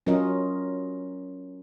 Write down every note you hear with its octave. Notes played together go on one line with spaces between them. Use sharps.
F#3 C#4 F4 A#4 D#5